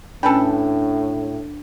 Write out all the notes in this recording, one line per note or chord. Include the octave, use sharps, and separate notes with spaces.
A2 C#4 D4 A4 B4 G5 G#5 B5